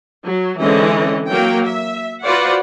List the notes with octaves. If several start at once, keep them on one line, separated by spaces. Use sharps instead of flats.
F#3
D3 E3 G#3 C4 C#4 D#5
F#3 A#3 A#4 G5
E5
F4 F#4 B4 C5 D5 F#5